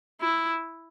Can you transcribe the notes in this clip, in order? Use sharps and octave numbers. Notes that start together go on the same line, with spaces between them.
E4